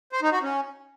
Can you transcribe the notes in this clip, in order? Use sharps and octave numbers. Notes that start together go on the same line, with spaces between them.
C5
D#4
F#4
C#4